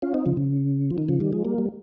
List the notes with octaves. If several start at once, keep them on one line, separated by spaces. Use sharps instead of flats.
C#4 F4
C4 D#4
C#3 F3
C#3
F3
D#3
C#3 F3
D#3 G3
F3 G#3
G3 A#3
G3